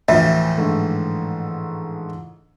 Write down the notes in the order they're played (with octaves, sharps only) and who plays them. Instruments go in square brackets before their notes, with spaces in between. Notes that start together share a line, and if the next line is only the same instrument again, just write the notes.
[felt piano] D2 [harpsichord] A2 E3 F3 [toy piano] E5
[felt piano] G#2 D3 A3